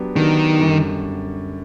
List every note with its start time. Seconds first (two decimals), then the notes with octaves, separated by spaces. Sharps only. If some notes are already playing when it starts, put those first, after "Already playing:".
Already playing: F#3 B3 D4 G4
0.15 D#3 F#3 B3 D4 G4
0.59 F#2 D3 G3